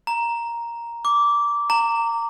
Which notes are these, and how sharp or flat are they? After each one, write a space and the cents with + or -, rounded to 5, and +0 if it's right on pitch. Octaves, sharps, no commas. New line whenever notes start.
A#5 +5
D6 -15
A#5 -20